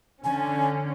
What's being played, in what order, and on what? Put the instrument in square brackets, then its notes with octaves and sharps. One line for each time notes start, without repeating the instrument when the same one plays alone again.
[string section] D3 C#4 [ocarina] G#5